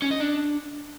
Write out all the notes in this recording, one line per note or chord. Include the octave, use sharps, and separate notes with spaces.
C#4
D#5
D4